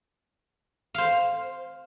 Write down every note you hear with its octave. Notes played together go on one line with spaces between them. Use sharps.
C5 F5